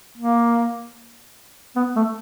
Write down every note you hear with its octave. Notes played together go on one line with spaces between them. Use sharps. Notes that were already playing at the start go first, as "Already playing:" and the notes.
A#3
B3
A3